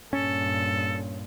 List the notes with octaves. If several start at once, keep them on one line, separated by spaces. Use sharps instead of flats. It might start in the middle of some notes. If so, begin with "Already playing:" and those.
G2 A#2 C#4 A4